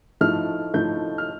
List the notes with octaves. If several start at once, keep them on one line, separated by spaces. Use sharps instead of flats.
A2 F3 A3 D#4 F6
A2 F3 A3 D#4 G6
F6